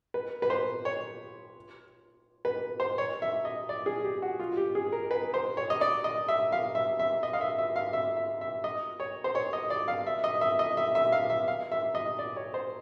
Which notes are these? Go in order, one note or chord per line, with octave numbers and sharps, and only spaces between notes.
B4
B4
C5
C#5
B4
C5
C#5
E5
D#5
D5
G#4
G4
F#4
F4
G4
G#4
A#4
B4
C5
C#5
D#5
D5
D#5
E5
F5
E5
E5
D#5
F5
E5
E5
F5
E5
E5
E5
D#5
C#5
C5
C#5
D#5
D5
F5
E5
D#5
E5
D#5
E5
E5
F5
E5
F5
E5
D#5
D5
C#5
C5